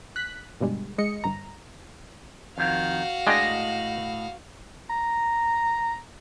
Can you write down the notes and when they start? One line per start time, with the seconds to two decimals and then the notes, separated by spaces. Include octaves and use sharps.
0.16 F#6 B6
0.61 G2 B2 D3 G3 G#3
0.98 G#3 D#5 C#7
1.24 G1 G2 A#5
2.58 F2 D#3 F#4 F5
3.27 A2 G#3 D4 D#5 G5
4.90 A#5